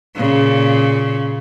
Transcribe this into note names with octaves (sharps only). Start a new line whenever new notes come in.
A#2 C#3